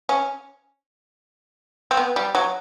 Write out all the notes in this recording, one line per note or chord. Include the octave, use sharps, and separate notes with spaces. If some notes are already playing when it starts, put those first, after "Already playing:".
C#4
C4
B3
G3
F#3